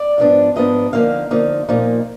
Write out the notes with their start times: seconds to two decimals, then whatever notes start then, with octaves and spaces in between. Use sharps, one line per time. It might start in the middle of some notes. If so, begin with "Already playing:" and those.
Already playing: D5
0.18 G#2 F3 B3 D4
0.56 G#2 F3 B3 D4 D#5
0.93 D3 F3 A#3 D#4 F5
1.31 D3 F3 A#3 D#4
1.69 A#2 F3 A#3 D#4